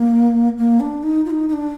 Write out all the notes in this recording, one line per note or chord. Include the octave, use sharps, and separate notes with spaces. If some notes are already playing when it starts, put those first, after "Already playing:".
Already playing: A#3
A#3
D4
D#4
F4
D#4
D#4
D4